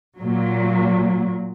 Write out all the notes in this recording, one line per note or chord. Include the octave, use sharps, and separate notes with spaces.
A#2 F#3